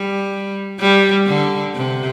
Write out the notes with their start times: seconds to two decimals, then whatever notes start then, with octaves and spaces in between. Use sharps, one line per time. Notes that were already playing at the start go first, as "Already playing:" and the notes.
Already playing: G3
0.80 G3
1.27 D3
1.75 C3